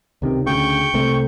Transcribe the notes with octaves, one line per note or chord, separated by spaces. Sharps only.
C#2 C3 D#3
D2 C#3 G5 C#6
C2 C3 A3